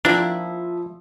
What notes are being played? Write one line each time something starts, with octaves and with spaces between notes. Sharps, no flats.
F3 A#3 C4 D4 E4